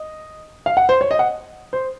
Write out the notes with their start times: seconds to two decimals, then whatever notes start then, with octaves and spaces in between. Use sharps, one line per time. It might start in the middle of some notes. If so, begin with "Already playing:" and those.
Already playing: D#5
0.66 F5
0.77 F#5
0.89 C5
1.01 C#5
1.11 D#5
1.19 F#5
1.73 C5